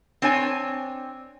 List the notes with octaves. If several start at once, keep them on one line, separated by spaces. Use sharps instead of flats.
C4 D4 C#5 G#5